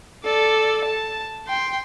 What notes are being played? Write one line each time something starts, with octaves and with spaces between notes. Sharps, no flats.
A4 D5
A5
G5 C6